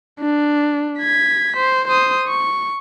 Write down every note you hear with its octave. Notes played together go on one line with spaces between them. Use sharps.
D4
G#6 B6
C5
C5 D#6
C#6